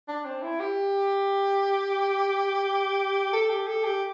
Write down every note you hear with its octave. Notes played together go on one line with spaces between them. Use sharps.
D4
C4
E4
G4
A4
G4
A4
G4